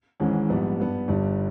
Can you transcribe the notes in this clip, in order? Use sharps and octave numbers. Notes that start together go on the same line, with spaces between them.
G#1 G#2 E3 G#3 C#4
A#1 G#2 G3 B3 G4
G2 G3 B3
G1 G2 G3